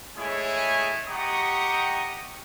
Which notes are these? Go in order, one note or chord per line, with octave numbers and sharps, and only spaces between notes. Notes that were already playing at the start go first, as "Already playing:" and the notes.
G#3 A3 E4 G#4 C#5 G#5
G4 D#5 F#5 A#5 C#6 D#6